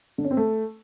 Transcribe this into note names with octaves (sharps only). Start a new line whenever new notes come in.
D3
C#4
C4
A3